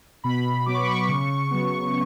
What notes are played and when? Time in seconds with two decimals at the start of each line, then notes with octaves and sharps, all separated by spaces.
0.24 B2 B5
0.66 F#3 B3 D6
0.74 C#6
0.82 B5
0.91 C#6
1.09 C#3
1.51 F#3 B3